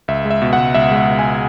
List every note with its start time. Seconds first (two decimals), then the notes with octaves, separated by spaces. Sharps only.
0.08 C#2 E5
0.25 G#3
0.30 E5
0.42 B2
0.53 F#5
0.58 C#2
0.74 C#2 E5
0.92 G#3
0.97 E5
1.08 B2
1.19 G#5